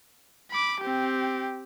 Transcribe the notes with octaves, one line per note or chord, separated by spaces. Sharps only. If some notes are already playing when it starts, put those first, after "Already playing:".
B5 D6
C4 G4